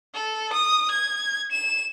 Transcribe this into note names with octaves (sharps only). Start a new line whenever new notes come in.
A4
D#6
G#6
E7